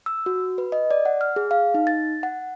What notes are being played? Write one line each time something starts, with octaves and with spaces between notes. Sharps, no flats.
E6
F#4
B4
D#5
D5
F#5
F6
G#4
F5
D#4
A6
F#5